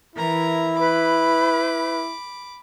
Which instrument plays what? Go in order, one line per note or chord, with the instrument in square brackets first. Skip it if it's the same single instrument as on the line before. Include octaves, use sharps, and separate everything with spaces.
[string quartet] E3 A#4 A#5 [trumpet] E4
[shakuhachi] B4 [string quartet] B5 D6